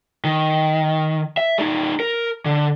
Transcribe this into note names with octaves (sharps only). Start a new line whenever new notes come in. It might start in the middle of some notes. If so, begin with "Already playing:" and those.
D#3
E5
G3 D#4
A#4
D3